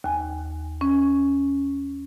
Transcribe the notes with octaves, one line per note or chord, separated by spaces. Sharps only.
D#2 G#5
C#4